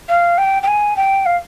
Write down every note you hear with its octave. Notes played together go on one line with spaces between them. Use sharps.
F5
G5
G5
G#5
G5
F5